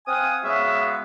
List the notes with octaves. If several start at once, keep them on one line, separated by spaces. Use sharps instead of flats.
C4 F5 F#5 G#5 D#6
C#3 G#3 B3 F#4 E5 F5